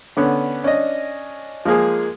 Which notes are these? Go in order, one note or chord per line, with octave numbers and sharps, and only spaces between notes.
D3 B3 C#4
C#4 D4 D#5
F3 G#3 A#3 G#4